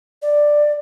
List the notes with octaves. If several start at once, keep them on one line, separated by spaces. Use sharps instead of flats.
D5